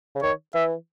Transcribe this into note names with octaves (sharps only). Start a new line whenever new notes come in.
C#3
D#3 C#5
E3 E5